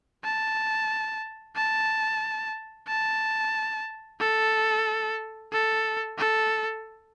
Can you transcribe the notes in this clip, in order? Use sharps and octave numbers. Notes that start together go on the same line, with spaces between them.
A5
A5
A5
A4
A4
A4